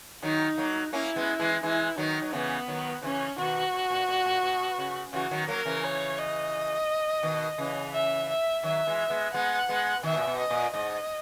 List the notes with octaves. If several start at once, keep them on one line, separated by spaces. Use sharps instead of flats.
D#3 F#3 D#4
F#3 A#3
A#3 C#4 E4
G#3 B3
E3 G#3
E3 G#3 E4
D#3 F#3 D#4
F#3
C#3 E3 B3
D#3 F#3
C#3 E3 C#4
B2 D#3 F#4
B2
A#2
A#2
A#2
B2
C#3
C#3 E3 F#4
D#3 F#3
F#3 A#3 A#4
C#3 E3
C#5
D#5
B2 D#3
C#3 E3
E5
E5
D#3 F#3 E5
E3 G#3
G#3 B3
G#3 B3 F#5
G#3 B3
B2 D#3 E5
A#2
B2
D#5
A#2
G#2 D#5